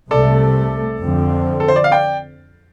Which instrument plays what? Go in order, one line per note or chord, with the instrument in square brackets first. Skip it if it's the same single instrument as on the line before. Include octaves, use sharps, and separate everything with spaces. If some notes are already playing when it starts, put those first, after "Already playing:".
[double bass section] C2 C3 A3 [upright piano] A4 D5
[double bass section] F2 D3 F3 C4
[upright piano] A4
C5
D5
F5
D5 G5